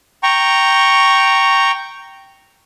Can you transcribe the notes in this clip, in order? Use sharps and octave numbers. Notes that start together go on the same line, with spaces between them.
G5 A#5 C#6